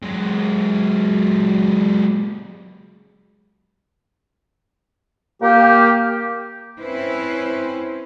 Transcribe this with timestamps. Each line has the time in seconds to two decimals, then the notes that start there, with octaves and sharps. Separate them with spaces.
0.03 F#3 G#3
5.42 A#3 G4
6.80 C4 C#4 E4 B4 C5